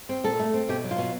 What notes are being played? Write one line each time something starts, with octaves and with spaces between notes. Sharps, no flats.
C4
A#2 A4
A3
C4
B2 G4
F#3
F4
B2